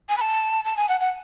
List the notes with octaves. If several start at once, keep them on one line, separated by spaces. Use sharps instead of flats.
G#5
B5
A5
A5
G#5
F#5
F#5